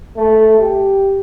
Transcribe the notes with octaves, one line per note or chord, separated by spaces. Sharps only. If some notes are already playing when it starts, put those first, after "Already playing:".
A3
G4